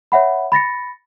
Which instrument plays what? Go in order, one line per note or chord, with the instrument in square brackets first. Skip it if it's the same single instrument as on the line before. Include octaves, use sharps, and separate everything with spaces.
[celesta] C#5 E5 F#5 B5
B5 A6 A#6 C#7